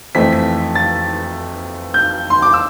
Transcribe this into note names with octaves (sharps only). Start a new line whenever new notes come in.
F2 E3 A3 C4 B6
B6
A6
G6
C6
D6
E6